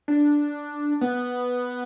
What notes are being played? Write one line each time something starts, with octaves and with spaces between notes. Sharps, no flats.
D4
B3